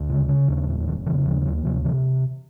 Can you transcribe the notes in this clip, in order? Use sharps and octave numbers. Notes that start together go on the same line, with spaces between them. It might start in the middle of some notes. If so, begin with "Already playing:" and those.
Already playing: D2
C#3
C#3
D#2
F1
F1 D#3
C#3 E3
D#2 F3
D2 F#3
C3 F3
C3 E3